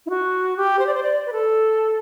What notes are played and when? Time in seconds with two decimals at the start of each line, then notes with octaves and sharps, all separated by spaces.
0.06 E4
0.10 F#4
0.57 G4
0.79 C5
0.87 D5
0.94 C5
1.03 D5
1.26 B4
1.32 A4